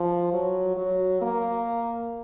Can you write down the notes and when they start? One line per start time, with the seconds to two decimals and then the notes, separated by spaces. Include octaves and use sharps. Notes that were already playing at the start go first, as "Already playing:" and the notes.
Already playing: F3
0.33 F#3
0.77 F#3
1.22 A#3